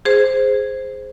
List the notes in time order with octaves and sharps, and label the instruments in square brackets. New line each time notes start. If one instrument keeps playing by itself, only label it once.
[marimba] G#4 C5